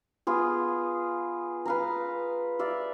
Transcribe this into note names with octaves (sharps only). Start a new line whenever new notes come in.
B3 F4 G#4
B4 F5 A#5
D5 E5 F5